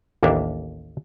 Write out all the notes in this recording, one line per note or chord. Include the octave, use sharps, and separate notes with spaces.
A1 D#2 A#3 D4 A#4 E5